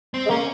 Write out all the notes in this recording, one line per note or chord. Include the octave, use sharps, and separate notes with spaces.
C4
G#3
A#3 C#4